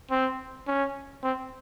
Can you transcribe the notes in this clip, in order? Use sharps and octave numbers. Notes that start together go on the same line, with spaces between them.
C4
C#4
C4